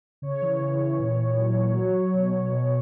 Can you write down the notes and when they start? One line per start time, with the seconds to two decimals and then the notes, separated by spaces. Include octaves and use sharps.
0.22 C#3 C#5
0.42 E3
0.61 C#3
0.80 E3
0.99 A#2
1.19 A#2
1.38 F#3
1.56 F#3
1.76 F#3
1.95 F#3
2.14 B2
2.32 B2
2.52 B2